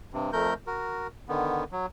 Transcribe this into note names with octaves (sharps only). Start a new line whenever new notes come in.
G2 C3
F2 A3 A#4 G6
F#4 A#4
D3 D#3 B3
F#3